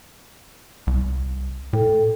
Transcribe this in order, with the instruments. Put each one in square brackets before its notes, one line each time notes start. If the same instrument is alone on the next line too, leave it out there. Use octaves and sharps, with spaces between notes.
[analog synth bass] C2
[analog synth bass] A2 [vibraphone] A4 G5